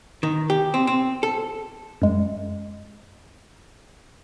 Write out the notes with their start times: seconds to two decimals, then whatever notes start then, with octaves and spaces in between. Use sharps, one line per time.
0.23 D#3
0.50 G4
0.74 C4
0.87 C4
1.23 A4
2.02 F#2 G#3